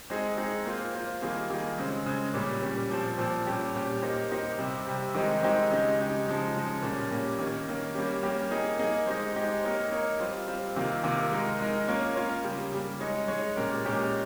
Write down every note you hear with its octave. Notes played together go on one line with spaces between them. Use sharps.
G#3 C4 D#4 G#4
G#3 C4 D#4 G#4
A#3 F4 C5
A#3 F4 C5
D#3 G3 A#3 F4 G#4
D#3 G3 A#3 F4 G#4
C#3 G#3 C4
C#3 G#3 C4
A#2 G3 C#4
A#2 G3 C#4
A#2 F3 C4
A#2 F3 C4
A#2 G3 C#4 G4
A#2 G3 C#4 G4
A#3 D#4 G4 C5
A#3 D#4 G4 C5
C3 G3 C4
C3 G3 C4
D#3 G#3 C4 D#4 G4
D#3 G#3 C4 D#4 G4
C#3 G#3 D#4 G4
C#3 G#3 D#4 G4
C#3 F3 G#3 D#4
C#3 F3 G#3 D#4
A#2 G3 A#3 C#4
A#2 G3 A#3 C#4
D#3 A#3 C#4
D#3 A#3 C#4
G3 A#3 C#4 G4
G3 A#3 C#4 G4
A#3 D#4 G#4
A#3 D#4 G#4
G#3 D#4 G4 C5
G#3 D#4 G4 C5
A#3 D#4 A#4 C#5
A#3 D#4 A#4 C#5
G3 C4 F4
G3 C4 F4
C3 D#3 A#3 F4
C3 D#3 A#3 F4
G#3 D#4 A#4
G#3 D#4 A#4
A#3 C#4 F4 A#4 C#5
A#3 C#4 F4 A#4 C#5
C#3 G3 A#3
C#3 G3 A#3
G#3 D#4 G#4 C#5
G#3 D#4 G#4 C#5
A#2 G#3 C#4 G4 A#4
A#2 G#3 C#4 G4 A#4